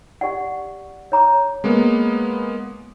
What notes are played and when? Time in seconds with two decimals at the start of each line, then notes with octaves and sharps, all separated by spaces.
0.21 G4 D5 F#5
1.12 C#5 A#5 D6
1.64 G#3 A#3 B3